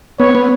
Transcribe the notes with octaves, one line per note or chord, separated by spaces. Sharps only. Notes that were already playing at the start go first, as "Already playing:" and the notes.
B3 C#5
B3